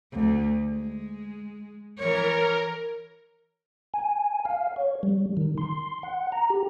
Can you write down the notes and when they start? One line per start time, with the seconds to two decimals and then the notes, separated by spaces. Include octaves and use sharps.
0.12 D2
0.65 G#3
1.98 E3 A#4 C#5
3.94 G#5
4.45 F5
4.76 C#5
5.03 G3
5.37 D#3
5.58 C6
6.03 F#5
6.32 A#5
6.50 G4